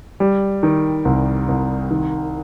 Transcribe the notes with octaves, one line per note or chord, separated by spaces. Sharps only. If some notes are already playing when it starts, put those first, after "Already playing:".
G3
D#3
C2
C2
D#3